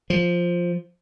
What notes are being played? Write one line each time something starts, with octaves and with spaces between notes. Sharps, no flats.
F3